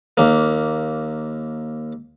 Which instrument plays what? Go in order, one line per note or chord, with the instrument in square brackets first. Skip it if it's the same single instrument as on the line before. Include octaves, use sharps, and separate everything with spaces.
[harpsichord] D#2 A#3